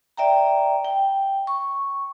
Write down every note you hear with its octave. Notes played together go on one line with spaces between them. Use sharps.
D5 E5 G5 A#5
G5
C#6